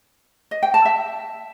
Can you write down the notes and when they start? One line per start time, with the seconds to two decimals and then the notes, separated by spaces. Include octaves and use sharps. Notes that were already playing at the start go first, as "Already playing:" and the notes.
0.51 D#5
0.63 G5
0.74 A5
0.85 E5